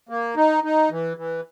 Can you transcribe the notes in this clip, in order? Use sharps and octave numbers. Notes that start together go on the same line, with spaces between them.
A#3
D#4
D#4
E3
E3